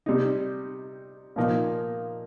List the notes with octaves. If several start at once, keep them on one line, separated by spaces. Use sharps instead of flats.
C3 G3 D#4
A#2 F3 A#3 D#4